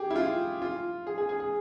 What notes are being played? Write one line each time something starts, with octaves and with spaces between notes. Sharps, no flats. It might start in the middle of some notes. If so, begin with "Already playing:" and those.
Already playing: G4 G#4
E4
F4
F4
G#4
G#4
G#4
G#4